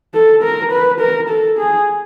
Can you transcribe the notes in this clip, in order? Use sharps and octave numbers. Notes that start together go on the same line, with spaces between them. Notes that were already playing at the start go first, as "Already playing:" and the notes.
A4
A#4
B4
A#4
A4
G#4